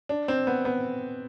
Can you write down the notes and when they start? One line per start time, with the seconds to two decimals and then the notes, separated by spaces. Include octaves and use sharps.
0.09 D4
0.28 C4
0.47 B3
0.65 B3